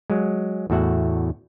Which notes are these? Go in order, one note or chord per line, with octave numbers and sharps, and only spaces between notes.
F#3 G#3
E2 A2 F#4 E5 F#5